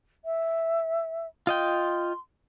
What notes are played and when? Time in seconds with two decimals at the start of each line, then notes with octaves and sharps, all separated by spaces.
0.24 E5
1.47 F4 D#5 G5 C6